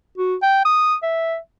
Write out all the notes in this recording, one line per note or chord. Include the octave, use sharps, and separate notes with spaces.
F#4
G5
D#6
E5